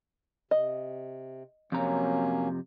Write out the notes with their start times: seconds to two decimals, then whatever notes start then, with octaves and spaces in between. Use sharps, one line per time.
0.51 C3 D#5
1.72 F2 C3 F#3 A#3 C#4 A#5